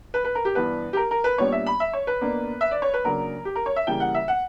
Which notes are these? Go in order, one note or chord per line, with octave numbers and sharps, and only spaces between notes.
B4
B4
A#4
G4
G2 E3 B3 D4 B4
G4
A#4
A#4
B4
A#2 G3 B3 D4 C#5
E5
B5
E5
C#5
B4
B2 A#3 D4
E5
D5
C#5
B4
C#3 F#3 A#3 D4 A#4
G4
A#4
C#5
E5
C#3 E3 G3 A#3 G5
F#5
E5
F#5